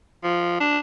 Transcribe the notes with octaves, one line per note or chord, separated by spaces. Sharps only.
F3
D4